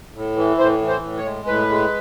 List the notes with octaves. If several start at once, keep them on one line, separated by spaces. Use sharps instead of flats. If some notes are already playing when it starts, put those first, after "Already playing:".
A2
E3
A2 C5
E3
C5
A2
C#5
G#3
A2 B4
G#3